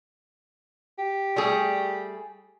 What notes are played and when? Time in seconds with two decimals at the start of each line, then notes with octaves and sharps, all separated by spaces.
0.99 G4
1.36 G3 A3 G#4